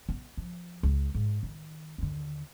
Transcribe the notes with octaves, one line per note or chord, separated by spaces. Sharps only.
B3
F3
C#2
G#2
D#3
D#2 D3